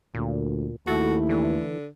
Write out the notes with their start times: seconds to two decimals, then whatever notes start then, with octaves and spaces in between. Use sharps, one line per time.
0.15 D2 A#2
0.87 D#2 A3 E4 F#4 A4
1.29 D3 E3